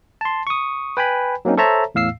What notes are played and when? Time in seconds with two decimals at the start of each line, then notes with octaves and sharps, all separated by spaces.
0.21 A5 C6
0.47 C#6 D#6
0.97 B4 G5 G#5 B5
1.45 F#3 A#3 C4 C#4 D#4
1.57 A4 C5 C#5 E5 A5 A#5
1.95 E2 A2 F5 E6 C7